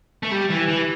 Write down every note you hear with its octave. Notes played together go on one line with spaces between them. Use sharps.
A3
G3
E3
E3